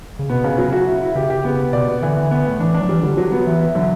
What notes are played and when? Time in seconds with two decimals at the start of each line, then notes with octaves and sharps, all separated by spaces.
0.19 C#3
0.30 B2 B3
0.44 C#3
0.58 F#3
0.72 F#4
0.87 E4
1.01 E4
1.15 C#3 G4
1.30 G4
1.45 C#3 B3
1.60 B3
1.73 B2 D5
1.88 B3
2.02 D3 E3
2.17 E3
2.31 B3
2.46 A2
2.59 E3 D4
2.74 D4
2.80 F#3
2.89 E3 G3
3.03 D3 G3
3.17 F#3
3.32 B3
3.46 E3 E4
3.61 E4
3.75 D3 F#3